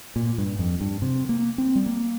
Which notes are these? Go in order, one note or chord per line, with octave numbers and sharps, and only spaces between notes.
A#2
G2
F2
G2
C3
A#3
C4
G3
A#3